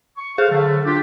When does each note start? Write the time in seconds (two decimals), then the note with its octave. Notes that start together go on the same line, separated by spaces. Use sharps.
0.17 C#6
0.38 G#4 A4 C5 F5
0.51 D3 F#3 A3
0.85 D4 F4 G4